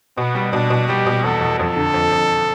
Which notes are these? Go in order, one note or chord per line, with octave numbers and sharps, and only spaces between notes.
B2 B3
G3
B2 D4
B2
G3 G4
B2
E2 A4
E2
F2 A4
D3
F2
F2